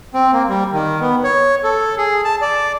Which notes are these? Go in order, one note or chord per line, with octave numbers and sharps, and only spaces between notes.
C4
A#3
G3
D#3
B3
C#5
A4
G#4
A5
D5